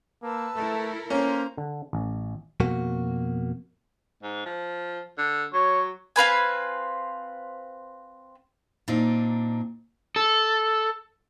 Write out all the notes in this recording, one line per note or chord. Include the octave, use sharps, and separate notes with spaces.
A#3 B4 A5 E6
A3 E4 A4 A#4
A#3 C#4 C5 A#5 C6
D3
A1
F2 B2 A#3 F#4
G#2
F3
D3
F#3 C#5
C4 F4 B4 G#5
A#2 C4 D4 D#4
A4